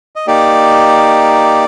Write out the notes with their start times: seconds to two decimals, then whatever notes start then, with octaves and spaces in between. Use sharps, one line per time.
0.16 D#5
0.27 A#3 D#4 G4 D5